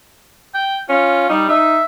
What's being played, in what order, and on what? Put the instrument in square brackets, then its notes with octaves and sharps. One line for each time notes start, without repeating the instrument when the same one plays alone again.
[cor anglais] G5
[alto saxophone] C#4 [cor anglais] F4
[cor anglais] G3 [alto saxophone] D#4
[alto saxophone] D#4 [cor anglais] E5